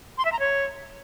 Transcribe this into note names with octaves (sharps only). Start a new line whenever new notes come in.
C6
E5
A#5
C#5